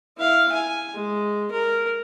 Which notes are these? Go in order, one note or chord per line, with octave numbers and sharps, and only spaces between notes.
E4 F5
G#5
G#3
A#4